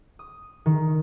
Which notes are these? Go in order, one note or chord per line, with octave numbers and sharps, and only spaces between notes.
D#6
D#3